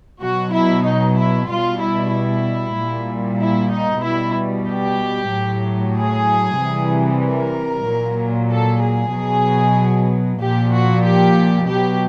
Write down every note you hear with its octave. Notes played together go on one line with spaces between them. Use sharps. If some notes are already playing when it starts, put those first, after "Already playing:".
B2 F#3 F#4
E4
D#4
E4
B2 G3 F4
E4
E4
A#2 G3
E4
D#4
B2 G3 E4
G4
A2 F#3
G#4
C3 E3 G3
A#4
A#2 F#3
A4
G#4
B2 F#3
A#2 F3 G4
F#4
G4
B2 F#3 G4